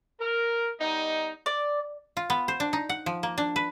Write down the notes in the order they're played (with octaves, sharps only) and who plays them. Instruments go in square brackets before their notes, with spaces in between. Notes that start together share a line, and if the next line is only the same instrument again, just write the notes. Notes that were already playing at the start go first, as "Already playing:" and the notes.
[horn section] A#4
G3 B3 D#4
[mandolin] D5
[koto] F4
B3
C5
D4
D#4
F#5
F3
A#3
D4
B4